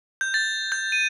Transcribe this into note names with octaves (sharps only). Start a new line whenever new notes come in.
G6
A6
G6
D#7